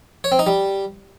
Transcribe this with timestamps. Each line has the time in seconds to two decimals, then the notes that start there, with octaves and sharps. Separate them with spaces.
0.24 C#5
0.32 C4
0.39 D#4
0.47 G3